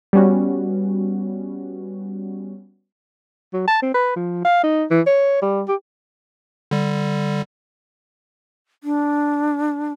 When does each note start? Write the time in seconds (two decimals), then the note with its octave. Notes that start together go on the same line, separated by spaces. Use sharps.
0.13 G3 B3 C#4 F#4
3.53 F#3
3.68 A5
3.82 C4
3.94 B4
4.16 F3
4.45 F5
4.64 D#4
4.91 E3
5.07 C#5
5.42 G3
5.68 G4
6.71 D3 G3
8.84 D4